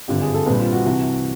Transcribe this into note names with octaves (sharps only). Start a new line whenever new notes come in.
G#1 G2 D3 F3 G4
G#4
A4
A#1 A#2 G3 C4 B4
F4
F#4
C2 C3 E3